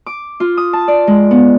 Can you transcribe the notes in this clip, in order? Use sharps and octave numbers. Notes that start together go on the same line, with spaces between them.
D6
F4
D#6
A5
D5
G#3
B3